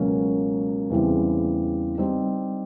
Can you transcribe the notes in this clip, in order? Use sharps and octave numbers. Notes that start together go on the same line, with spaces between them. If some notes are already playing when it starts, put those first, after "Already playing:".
Already playing: C#2 B2 F#3 A#3 C#4
E2 C#3 E3 G3 C4
G3 C4 D#4